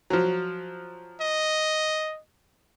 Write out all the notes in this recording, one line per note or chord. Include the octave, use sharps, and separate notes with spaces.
F3 F#3
D#5